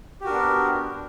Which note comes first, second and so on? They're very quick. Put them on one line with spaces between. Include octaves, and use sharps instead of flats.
G4 F#4 A#4 D4 B3